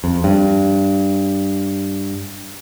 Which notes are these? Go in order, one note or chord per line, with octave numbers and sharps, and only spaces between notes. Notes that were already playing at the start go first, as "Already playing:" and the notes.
F2
G2